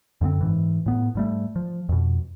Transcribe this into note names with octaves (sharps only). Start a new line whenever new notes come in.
F#2 D3 B3 C4
G#2 E3
A2 B3
G#2 G3 A3
F3
F2 B2